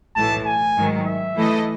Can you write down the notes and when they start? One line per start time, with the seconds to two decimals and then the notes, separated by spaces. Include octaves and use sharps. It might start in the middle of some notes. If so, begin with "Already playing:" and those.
0.16 B1 A2 E3 A3 A5
0.46 G#5
0.76 G#2 D#3 F#3
1.06 E5
1.36 E3 A3 E4 A4 D#5